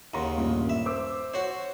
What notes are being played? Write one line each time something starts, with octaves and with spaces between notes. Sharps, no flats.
D#2 C#3 F#5 A#5 C6
A1 G2 A#2
E5
C5 D6 E6
F#4 C5 C#5